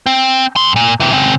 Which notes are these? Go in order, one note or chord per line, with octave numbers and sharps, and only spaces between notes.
C4
F2 C6
A#2
C3 E3
C#3 C4